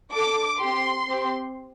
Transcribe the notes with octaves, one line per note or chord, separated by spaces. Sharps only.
D4 A4 D6
C4 G4 C6
C4 G4